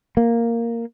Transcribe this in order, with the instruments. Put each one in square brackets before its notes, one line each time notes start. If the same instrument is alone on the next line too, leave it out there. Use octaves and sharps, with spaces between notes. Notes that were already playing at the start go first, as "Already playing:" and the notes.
[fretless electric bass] A#3